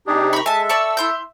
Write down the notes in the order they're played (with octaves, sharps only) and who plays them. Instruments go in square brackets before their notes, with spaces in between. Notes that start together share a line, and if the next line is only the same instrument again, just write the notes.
[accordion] C3 D#4 G4 [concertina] D4 G#4
[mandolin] A#4 C#6 [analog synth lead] B5
[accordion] G#3 [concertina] A4 [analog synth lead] E5 [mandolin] G#5 A5
[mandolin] D5 A5 C#6 [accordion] E6
[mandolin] E4 C6 G6